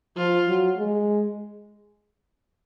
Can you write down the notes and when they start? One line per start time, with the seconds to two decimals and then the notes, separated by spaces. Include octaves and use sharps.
0.17 F3 F4
0.48 F#3
0.77 G#3